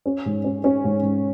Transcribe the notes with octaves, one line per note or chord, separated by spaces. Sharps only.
C#4
G#2
C#4
C#4
G#2
G#2